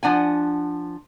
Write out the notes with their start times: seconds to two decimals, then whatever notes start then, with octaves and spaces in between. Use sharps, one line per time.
0.03 F3 D4 F#5 G#5